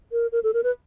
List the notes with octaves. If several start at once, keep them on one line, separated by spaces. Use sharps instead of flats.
A#4
A#4
A4
A#4
B4